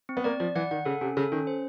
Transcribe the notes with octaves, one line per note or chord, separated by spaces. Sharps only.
C4
B3
A#3 D5
F3 D5
E3 F#5
D#3 F#5
C#3 A4
C3 C#4
C#3 A4
D#3 C#4
C5